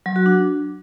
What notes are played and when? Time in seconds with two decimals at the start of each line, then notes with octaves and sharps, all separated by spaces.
0.06 F#3
0.16 F#4
0.26 D4